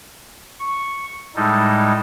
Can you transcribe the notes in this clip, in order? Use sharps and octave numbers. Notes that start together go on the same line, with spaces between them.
C#6
A2 G3 G#3 D#4 A4